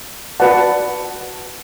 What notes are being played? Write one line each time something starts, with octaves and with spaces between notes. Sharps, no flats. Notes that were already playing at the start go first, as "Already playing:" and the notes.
F#4 B4 D5 F#5 A5